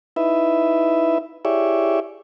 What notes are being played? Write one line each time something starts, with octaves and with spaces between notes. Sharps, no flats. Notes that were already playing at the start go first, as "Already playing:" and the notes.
D#4 E4 B4 E5
E4 G4 G#4 C#5 D5 E5